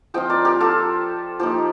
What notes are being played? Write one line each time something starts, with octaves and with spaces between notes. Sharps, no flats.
F3 C4 F4 D#5 G5
A#4 D5
G4 A#4
F4 A4
F3 A#3 D#4 G4